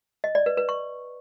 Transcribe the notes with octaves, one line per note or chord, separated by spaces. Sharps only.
D#5
D5
B4
B4
C#6